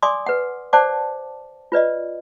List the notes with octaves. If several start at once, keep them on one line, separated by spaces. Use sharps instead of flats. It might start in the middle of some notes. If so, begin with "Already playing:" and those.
D5 G#5 C6 D6 D#6
B4 F#5
C5 D5 F#5 A5 D6
F4 B4 D5 D#5